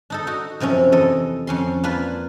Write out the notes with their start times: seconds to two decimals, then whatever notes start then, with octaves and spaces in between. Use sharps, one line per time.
0.10 D4 D#4 A4
0.27 D#4 F#4
0.60 F#2 C3 F3 C#4
0.92 E2 A4 D#5
1.47 F2 C#4 C6
1.84 A#3 D4 F4 B4